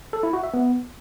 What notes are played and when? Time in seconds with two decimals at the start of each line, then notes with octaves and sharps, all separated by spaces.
0.13 A4
0.23 E4
0.33 F#4
0.43 E5
0.54 B3